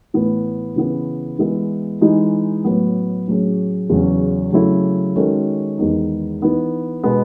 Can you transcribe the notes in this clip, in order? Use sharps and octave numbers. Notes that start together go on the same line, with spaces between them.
A2 E3 B3
C#3 E3 B3
E3 G#3 B3 E4
E3 G#3 D#4
A2 F#3 B3
A2 F#3 C#4 G#4
E2 C#3 F#3 C#4
C#3 F#3 A3 E4
D#3 G#3 C#4 F#4 A4
E2 D#3 G#3 B3 D#4
E3 B3 D#4
B2 G#3 B3